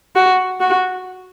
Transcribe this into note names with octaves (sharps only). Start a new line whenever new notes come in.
F#4
F#4